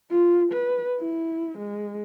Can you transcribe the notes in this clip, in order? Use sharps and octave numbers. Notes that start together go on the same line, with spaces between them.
F4
B4
E4
G#3